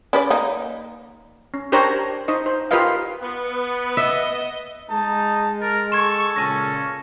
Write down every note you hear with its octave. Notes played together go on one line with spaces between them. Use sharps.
C#4 B4 D5
A#3 D#4
C#4
D4 G4 A#4 C5 C#5 A#5
D#4 C5 D#5
C5
F4 G4 A#4 B4 D#5 F5
B3
D#5 E5
G#3 D#4 A5
A#4 A6
A4 C#6 G#6 E7
A#2 C#3 C#4 A5 A#6